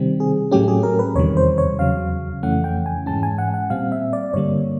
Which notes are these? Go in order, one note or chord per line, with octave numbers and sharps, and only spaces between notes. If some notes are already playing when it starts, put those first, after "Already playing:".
Already playing: C3 D#3 G3 C4
G#4
A2 F#3 A3 C#4 G4
G#4
A#4
B4
E2 C3 D#3 G3 C#5
C5
C#5
E2 C#3 F#3 F5
F2 C#3 E3 A3 C#4 F#5
G5
G#5
G#2 E3 G#3 C#4 A5
G#5
F#5
F#5
A#2 G3 C4 F5
E5
D5
G2 D3 G3 A#3 C#5